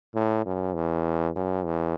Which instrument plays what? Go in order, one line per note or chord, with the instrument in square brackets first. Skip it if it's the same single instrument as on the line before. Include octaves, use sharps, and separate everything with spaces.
[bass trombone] A2
F#2
E2
F#2
E2